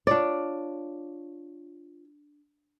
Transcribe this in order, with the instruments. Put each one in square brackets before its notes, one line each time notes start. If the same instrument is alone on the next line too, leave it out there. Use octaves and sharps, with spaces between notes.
[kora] D4 D5 [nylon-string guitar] F4 C#5